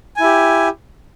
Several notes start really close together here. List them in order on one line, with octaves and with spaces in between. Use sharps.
G#5 E4 G4